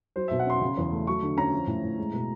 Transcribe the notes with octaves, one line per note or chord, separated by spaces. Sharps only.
F#3 C5
B2 E5
F#5
C#4 C6
C#3
E2
A3
F#3 C#6
D3
C#4 A#5
F3
A2
A2
G#3
B2